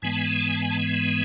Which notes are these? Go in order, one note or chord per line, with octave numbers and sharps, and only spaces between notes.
G#2 E3 G#3 B3 G#5
A5
G#5
A5
G#5
A5
G#5
A5
G#5
A5